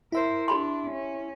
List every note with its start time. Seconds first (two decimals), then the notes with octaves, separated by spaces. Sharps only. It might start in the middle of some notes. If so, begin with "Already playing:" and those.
0.12 E4 A#4 C5 E5
0.48 D4 G4 B5 C6
0.91 C#4